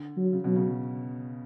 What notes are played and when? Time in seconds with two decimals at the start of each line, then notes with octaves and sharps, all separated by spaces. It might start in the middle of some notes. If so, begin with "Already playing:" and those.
Already playing: D3
0.17 F#3
0.33 C#3
0.44 B2 F#3
0.56 C#3